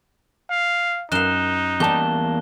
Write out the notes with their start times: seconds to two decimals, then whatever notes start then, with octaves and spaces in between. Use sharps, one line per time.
0.50 F5
1.12 F#2 D#4 F5 F#6 E7 G7
1.80 E2 G3 A#3 G4 A5 G7